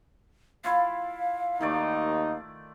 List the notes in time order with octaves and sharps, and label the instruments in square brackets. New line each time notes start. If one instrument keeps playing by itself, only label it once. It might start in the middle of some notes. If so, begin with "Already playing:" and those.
[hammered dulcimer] E4 F4 [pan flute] F5
[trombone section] D#2 D#4 [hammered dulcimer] D#3 A3 D5